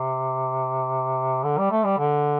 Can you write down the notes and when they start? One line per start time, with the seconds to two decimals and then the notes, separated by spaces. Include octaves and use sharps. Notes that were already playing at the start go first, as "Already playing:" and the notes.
Already playing: C3
1.44 D3
1.58 G3
1.71 A3
1.85 G3
1.98 D3